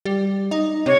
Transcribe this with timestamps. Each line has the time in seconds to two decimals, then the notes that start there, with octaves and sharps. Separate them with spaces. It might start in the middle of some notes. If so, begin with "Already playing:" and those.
0.05 G3
0.51 D#4
0.86 C3 C#5